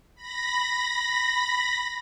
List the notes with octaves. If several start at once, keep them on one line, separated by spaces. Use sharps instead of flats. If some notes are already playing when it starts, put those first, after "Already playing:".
B5 A#6